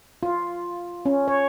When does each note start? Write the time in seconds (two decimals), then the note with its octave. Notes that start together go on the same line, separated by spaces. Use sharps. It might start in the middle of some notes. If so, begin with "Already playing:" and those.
0.23 F4
1.06 C#4
1.28 C#5